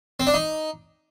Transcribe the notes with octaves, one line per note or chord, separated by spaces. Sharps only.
C4
D4
D#4